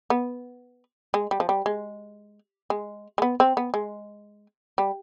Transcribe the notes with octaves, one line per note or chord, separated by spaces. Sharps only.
B3
G#3
G3
F3
G3
G#3
G#3
G#3
B3
C4
B3
G#3
G3